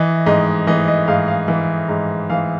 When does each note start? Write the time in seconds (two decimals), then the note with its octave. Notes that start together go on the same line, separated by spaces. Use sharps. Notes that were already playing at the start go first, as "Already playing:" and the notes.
Already playing: E3 D#5
0.26 G#2 D#5
0.67 E3 D#5
0.88 D#5
1.08 G#2 F5
1.28 F5
1.48 E3
1.89 G#2
2.30 E3 F5